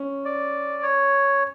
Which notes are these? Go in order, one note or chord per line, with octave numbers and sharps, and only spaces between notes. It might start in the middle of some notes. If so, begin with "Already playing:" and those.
Already playing: C#4
D5
C#5